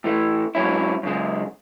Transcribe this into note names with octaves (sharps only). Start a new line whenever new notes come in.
A2 E3 A3
G#2 F#3 C#4 E4
F#2 C#3 G#3